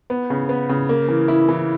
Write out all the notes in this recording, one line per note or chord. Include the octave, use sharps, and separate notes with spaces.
B3
C#3
B3
C#3
A#3
E3
E4
E3